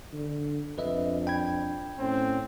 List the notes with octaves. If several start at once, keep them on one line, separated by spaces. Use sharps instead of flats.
D3
F2 D4 B4 D#5 E5
G5 B5 G#6
A2 C4 C#4